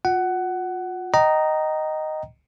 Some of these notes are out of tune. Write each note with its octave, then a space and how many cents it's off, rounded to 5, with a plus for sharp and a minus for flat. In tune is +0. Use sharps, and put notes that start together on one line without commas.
F4 +35 F#5 +15
D#5 +0 G5 -30 A#5 +0